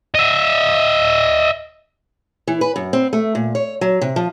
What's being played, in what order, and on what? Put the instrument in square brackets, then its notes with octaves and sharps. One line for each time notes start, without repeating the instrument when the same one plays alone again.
[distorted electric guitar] D#5 E5
[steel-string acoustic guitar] E3
B4
F#2
C4
A3
A#2
C#5
F#3
C3
F3